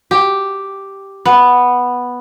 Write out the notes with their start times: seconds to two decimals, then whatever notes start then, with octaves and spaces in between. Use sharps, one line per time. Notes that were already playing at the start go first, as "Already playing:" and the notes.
0.11 G4
1.25 B3